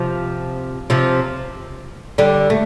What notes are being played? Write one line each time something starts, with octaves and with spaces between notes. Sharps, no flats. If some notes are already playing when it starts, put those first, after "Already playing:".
Already playing: C3 F3
C3 F3
D3 G3
A3